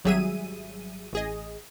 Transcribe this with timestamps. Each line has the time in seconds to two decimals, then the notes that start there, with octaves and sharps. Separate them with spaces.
0.04 G#1 F#3 G3 G#4 E5 D#7
1.13 A1 G#4 D#5